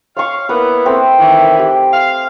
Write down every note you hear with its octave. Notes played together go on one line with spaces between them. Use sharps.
C#5 F5 C#6
A#3 B3 E4 B4
A3 C4
D#3 E3 E4
G4
F5